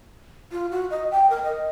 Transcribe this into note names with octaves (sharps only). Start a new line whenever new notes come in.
F4
F#4
D#5
G5
A#4
D#5